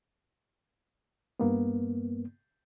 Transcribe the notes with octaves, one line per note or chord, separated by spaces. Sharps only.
G2 A#3 B3